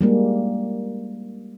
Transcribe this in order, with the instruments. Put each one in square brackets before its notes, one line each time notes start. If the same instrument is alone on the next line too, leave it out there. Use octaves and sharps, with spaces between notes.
[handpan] G3 G#3 A#3